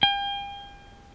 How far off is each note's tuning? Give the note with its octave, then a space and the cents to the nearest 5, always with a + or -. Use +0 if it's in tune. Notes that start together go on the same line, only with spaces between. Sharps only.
G5 +40